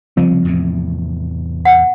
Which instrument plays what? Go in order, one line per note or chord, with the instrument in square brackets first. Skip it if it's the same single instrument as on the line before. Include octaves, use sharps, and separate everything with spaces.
[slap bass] C2 C#3 [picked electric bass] F3 C4
[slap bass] E2 A2 C3
[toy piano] F#5